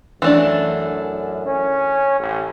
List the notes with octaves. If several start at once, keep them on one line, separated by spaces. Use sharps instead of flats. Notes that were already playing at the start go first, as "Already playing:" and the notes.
F#2 E3 A3 D4
C#4
A1